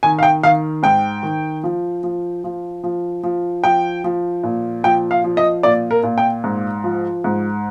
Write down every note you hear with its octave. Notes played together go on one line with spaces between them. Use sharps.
D#3 G#5
F5
G5
D#3 F5
G#2 G5
D#3
F3
F3
F3
F3
F3
F3 G5
F3
A#2
F3 G5
F5
F3
D#5
A#2 D5
A#4
A#2
G5
G#2
F3
G#2